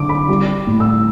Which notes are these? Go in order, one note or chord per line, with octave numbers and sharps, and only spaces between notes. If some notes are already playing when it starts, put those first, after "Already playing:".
Already playing: D3 D6
B5
G3
A2
E6